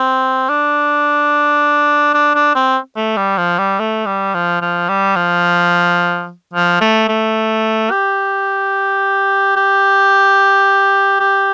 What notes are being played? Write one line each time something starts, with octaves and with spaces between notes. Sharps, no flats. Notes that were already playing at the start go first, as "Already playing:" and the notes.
Already playing: C4
D4
D4
D4
C4
A3
G3
F3
G3
A3
G3
F3
F3
G3
F3
F3
A3
A3
G4
G4
G4